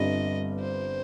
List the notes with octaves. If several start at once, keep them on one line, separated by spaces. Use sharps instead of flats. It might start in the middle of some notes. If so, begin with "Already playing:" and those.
Already playing: G1 G2 G3 C4 F4 D#5
C5